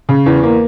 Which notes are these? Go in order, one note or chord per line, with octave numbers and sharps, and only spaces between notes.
C#3
E2
A#3